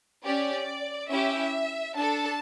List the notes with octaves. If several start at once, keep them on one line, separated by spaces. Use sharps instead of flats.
C#4 G4 D5
C#4 E4 G4 E5
D4 A4 A5